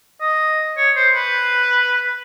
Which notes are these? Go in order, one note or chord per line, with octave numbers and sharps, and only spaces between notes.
D#5
C#5
C5
B4